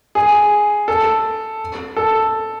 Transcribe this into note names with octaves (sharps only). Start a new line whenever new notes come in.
G#4
A4
A4